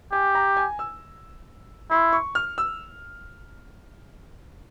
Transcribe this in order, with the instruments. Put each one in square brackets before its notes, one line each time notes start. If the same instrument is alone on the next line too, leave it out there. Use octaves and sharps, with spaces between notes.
[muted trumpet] G4 [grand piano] G#5
[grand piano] A#5
G#5
E6
[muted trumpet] E4 [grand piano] C6
[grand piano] C#6
F6
E6